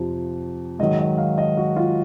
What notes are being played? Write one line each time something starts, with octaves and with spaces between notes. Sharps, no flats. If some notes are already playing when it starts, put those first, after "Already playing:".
Already playing: F2 C3 F3
G#2 D#3 F#3 D#5
D#5
F5
D#5
F#4
F4